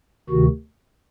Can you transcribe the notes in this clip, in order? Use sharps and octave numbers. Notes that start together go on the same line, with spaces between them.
D2 C3 D#3 F#4